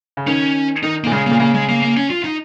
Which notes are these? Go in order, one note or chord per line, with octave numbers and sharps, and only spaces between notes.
C#3
D#3 C#4
D#3 D#4
A#2 A#3
C#3 G#3
A#3
A#2
C#3 A#3
G#3
A#3
A#3
C#4
F4
D#4